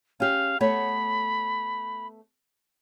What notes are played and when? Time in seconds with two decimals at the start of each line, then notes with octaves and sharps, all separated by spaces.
0.20 C#4 G4 F5
0.61 A3 B3 C#5 B5